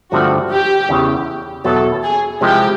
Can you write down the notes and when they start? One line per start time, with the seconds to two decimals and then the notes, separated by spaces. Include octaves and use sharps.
0.11 G2 D3 F3 A3 C4 F#4
0.50 G4
0.89 E2 C#3 E3
1.64 E2 B2 F#3 B3 E4 A4
2.03 G#4
2.41 C3 F3 G#3 C4 E4 G4